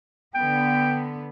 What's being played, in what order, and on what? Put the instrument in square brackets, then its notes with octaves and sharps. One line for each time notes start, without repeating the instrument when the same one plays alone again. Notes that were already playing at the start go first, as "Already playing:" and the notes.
[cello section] D3 B3 [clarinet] G5